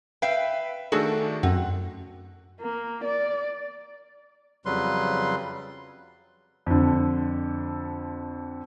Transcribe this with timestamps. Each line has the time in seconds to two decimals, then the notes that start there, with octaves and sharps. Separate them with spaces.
0.22 B4 E5 F5 G5
0.92 D#3 A3 D4 F#4 G#4 A4
1.43 F#2 C4 F#5
2.60 A#3
3.04 D5
4.66 F2 C#3 F#3 G3 B4 C6
6.66 F2 D3